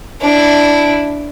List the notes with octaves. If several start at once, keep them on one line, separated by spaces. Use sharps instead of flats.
D4 E4